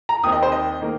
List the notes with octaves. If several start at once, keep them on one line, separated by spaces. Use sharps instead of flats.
A#5
D#2 D#3 C4 D#6
D#5
C5
D#5
D#3 A#3